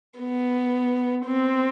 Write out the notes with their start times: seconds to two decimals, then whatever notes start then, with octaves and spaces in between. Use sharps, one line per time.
0.19 B3
1.26 C4